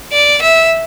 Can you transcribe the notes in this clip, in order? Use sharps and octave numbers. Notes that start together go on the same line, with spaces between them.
D5
E5